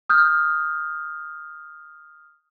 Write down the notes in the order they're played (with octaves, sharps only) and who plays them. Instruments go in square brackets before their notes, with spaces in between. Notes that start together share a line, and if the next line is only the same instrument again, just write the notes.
[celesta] D#6 F6 G6